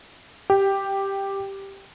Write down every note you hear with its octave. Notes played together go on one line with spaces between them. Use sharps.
G4